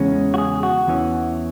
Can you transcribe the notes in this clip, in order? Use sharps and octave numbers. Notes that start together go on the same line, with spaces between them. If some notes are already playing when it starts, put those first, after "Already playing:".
Already playing: E2 C#3 G#3 C#4
F#4
G#4
F#4
E2 E3 C#4